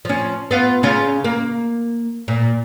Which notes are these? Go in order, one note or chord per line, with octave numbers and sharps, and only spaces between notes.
F3 C#4
B3 F4
C#3 C#4 F4
A#3
A#2